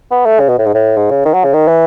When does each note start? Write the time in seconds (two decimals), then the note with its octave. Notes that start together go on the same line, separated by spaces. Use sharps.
0.11 B3
0.26 A3
0.40 C#3
0.49 B2
0.58 A2
0.66 G#2
0.74 A2
0.97 G#2
1.10 C#3
1.25 D#3
1.34 F#3
1.44 C#3
1.53 D#3
1.68 E3